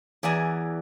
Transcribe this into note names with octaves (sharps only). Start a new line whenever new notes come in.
E2 E3 D5 E5 G#5 A#5